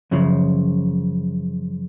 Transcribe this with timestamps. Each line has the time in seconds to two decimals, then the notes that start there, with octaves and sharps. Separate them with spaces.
0.11 F#2 C#3 F3